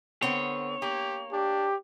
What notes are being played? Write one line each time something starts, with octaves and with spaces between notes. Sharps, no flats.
D3 B3 C4 C#5
A#3 G4
D4 G4